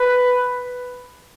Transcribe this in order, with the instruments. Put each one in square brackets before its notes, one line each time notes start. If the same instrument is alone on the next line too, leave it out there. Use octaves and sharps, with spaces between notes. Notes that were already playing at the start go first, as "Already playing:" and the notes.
Already playing: [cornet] B4